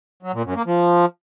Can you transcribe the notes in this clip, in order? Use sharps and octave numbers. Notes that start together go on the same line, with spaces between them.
F#3
A#2
F#2
A#3
F3